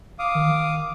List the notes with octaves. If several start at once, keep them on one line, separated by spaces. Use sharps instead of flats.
F5 D6 D#6
D#3